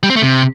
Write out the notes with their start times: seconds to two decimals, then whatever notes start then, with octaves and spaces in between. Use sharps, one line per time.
0.03 G3
0.10 C4
0.16 A3
0.23 C3